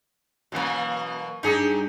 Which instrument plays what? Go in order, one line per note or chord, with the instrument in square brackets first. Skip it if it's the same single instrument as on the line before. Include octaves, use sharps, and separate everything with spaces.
[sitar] B2 E3 A#3 [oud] F#3 C#4
[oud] G2 F#3 D4 [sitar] D#4 G4 G#4